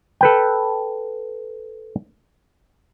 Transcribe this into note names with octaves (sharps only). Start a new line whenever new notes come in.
A4 B4 G5